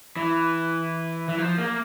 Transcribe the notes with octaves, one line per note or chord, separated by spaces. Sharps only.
E3
E3
F3
A#3